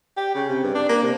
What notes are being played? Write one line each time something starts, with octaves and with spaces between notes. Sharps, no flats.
G4
C#3
C3
G2
D4
A#3
C3